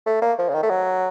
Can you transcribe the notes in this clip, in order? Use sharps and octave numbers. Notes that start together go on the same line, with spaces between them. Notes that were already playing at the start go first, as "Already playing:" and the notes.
A3
A#3
F3
C#3
D#3
A3
F#3